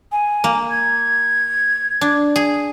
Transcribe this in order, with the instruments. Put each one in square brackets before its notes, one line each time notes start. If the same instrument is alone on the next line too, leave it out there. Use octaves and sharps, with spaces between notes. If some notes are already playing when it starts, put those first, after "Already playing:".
[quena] G#5
[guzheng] A#3
[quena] G#6
[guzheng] D4
G#4